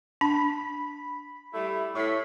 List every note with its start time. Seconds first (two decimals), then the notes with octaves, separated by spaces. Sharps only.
0.21 D4 B5
1.53 G3 A3 E4
1.95 A2 C#6 B6